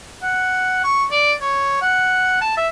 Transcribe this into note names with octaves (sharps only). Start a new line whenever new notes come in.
F#5
C#6
D5
C#5
F#5
A5
E5